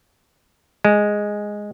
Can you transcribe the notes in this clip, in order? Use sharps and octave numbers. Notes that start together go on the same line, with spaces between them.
G#3